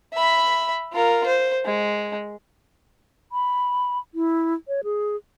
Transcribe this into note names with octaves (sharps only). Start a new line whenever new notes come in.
E5 B5
F4 A#4
C5
G#3
B5
E4
C#5
G#4